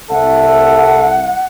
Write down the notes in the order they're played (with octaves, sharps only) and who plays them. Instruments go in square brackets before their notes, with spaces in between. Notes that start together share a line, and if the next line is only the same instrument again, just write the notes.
[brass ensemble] C2 E5 [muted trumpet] A4 [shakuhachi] F#5